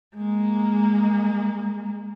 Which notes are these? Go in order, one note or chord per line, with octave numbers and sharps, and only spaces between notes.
G#3 A#3